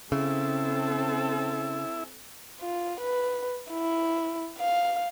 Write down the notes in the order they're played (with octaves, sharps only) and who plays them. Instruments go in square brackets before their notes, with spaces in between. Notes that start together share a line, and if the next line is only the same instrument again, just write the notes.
[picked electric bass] C#3 [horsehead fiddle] C4 A4 [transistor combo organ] E4
[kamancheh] F4
B4
E4
F5